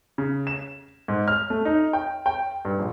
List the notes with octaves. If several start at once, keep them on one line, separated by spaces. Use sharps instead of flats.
C#3
E7
G#2
F6
A3
D#4
G5
G5
G2
A#1